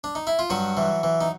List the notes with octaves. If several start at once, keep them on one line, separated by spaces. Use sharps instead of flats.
D4
D#4
E4
F4
G2 F#3 F#4
E3
E3
D#4